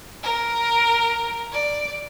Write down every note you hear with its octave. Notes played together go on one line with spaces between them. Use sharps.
A#4
D5